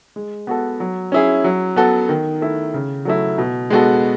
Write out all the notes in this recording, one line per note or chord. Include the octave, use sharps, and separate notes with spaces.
G#3
B3 F#4 A4
F#3
C#4 E4 G#4
F#3
B3 F#4 A4
D#3
A3 E4
C#3
F#3 A3 E4
B2
G#3 B3 F#4 A4